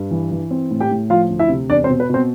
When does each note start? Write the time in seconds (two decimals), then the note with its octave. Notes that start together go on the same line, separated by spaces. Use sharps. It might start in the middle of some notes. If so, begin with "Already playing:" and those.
Already playing: G2
0.11 E3
0.31 E3
0.51 C4
0.71 A2
0.80 G4 G5
0.91 A2
1.10 F3 F4 F5
1.30 D2
1.39 E4 E5
1.49 C3
1.70 E2 D4 D5
1.84 C4 C5
1.90 B2
2.00 B4
2.10 B2 C4 C5